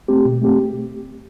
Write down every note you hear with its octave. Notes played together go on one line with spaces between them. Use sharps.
A3 C4 G4
B2
A3 C4 G4